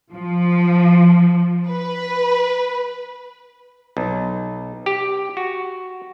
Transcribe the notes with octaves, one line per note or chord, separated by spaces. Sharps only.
F3
B4
B1
G4
F#4